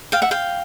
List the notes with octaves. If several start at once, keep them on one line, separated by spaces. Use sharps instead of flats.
F5 G5
E5 F#5
F5 G5